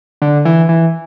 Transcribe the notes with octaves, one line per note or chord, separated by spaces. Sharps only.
D3
E3
E3